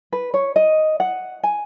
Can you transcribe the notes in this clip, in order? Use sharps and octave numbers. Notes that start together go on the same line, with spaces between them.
B4
C#5
D#5
F#5
G#5